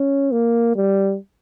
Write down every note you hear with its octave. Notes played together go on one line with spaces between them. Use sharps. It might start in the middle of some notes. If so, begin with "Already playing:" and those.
Already playing: C#4
A#3
G3